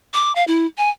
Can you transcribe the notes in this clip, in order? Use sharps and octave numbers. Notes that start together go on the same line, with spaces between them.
D6
F5
E4
G#5